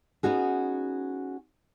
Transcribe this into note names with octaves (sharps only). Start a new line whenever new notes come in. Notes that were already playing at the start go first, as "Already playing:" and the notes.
B3 C#4 D#4 F#4 G#4